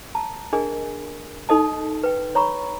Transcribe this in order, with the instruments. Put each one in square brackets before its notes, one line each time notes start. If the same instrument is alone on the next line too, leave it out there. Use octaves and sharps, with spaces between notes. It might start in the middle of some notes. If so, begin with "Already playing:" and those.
[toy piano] A5 A#5
D4 G#4 A#4 D#5 G#5
D#4 A4 D#5 A5
B4 G5
C#5 A#5 B5 C#6